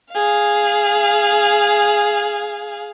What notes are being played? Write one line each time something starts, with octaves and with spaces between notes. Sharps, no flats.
G#4 F5